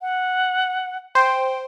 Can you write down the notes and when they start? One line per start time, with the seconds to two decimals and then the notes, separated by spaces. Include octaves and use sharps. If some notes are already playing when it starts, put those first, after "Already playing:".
0.02 F#5
1.15 C5 G5